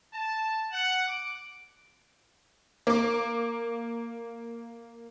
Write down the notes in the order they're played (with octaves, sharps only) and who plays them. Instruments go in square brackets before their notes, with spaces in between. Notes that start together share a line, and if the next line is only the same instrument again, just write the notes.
[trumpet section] A5
F#5
D6
[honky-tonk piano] A#3 D6